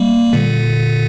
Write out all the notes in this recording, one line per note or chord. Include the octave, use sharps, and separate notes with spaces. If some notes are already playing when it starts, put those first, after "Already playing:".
Already playing: G3 A#3
A#2 D3